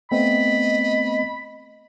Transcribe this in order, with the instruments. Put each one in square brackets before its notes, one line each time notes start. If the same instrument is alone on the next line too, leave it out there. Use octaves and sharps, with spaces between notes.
[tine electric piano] A3 B3 C4 [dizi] D#5 [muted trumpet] B5